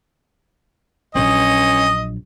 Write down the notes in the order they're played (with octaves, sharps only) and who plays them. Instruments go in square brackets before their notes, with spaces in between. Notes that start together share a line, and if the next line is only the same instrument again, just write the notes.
[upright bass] A#1 F#3 [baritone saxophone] C#4 [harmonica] D#5